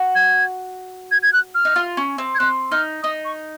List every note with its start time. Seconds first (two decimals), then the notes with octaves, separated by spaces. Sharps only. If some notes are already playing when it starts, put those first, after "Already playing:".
Already playing: F#4
0.15 G#6
1.11 G#6
1.23 G#6
1.33 F#6
1.55 F6
1.65 D#4
1.76 F4
1.97 C#4
2.18 C4
2.35 G#6
2.39 C4 F#6
2.72 D#4 F6
3.03 D#4 D#6
3.25 C#6